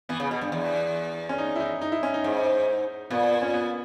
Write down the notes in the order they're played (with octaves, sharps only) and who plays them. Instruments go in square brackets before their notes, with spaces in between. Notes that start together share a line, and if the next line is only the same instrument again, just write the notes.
[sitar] E3 [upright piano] B3
[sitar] C#3
B2
G2
E2
[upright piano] C#4
D#4
E4
D#4
D#4
E4
C#4
D#4
[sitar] G#2
[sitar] A#2 [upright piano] B3
[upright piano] C#4
B3